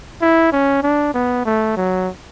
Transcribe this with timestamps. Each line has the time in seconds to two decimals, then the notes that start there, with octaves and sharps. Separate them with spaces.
0.22 E4
0.52 C#4
0.83 D4
1.14 B3
1.45 A3
1.77 F#3